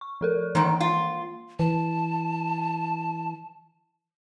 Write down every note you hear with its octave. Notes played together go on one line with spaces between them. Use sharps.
C#6
F3 A4 A#4
G#2 D#3 E3 A#3
F4
E3 A5